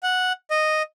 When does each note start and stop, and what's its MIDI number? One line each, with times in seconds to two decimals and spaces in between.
0.03 0.33 78
0.51 0.82 75